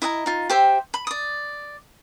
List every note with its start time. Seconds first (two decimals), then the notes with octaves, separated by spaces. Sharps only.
0.02 E4 D#5 F#5 A#5
0.26 D#4 F4
0.50 G4 C5 E5 G5
0.94 B5
1.07 D5 D#6